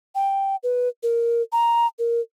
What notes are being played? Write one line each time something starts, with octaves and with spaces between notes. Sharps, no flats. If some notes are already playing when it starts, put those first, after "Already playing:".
G5
B4
A#4
A#5
A#4